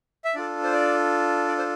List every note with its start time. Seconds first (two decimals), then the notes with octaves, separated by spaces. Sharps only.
0.24 E5
0.35 D4 F4 A4 D5
0.64 C5
0.73 D5
1.48 D5
1.58 C5